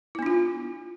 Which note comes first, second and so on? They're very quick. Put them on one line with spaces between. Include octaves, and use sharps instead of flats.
E4 B3 D4 F4